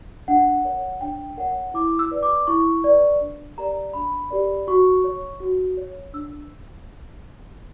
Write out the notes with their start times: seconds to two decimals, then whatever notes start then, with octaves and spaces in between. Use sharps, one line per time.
0.28 D4 F#5
0.65 A#4 C#5
1.01 D4 G5
1.37 A#4 C#5 F#5
1.74 E4 D6
1.99 E6
2.11 B4 D5
2.23 D6
2.47 E4 C#6
2.84 B4 D5
3.20 D4
3.57 G4 A#4 D5 A#5
3.94 D4 B5
4.31 G4 A#4 D5
4.67 F#4 C#6
5.04 C#5
5.40 F#4
5.77 C#5
6.13 D4 E6